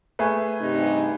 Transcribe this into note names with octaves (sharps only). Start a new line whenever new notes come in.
A3 G#4 B4
G2 C3 D#4